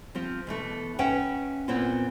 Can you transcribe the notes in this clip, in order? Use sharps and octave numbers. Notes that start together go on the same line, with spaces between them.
F3 C4 F4
B2 E3 A3
C#4 B4 E5 F#5 G5
A#2 B3 C4 E4 F4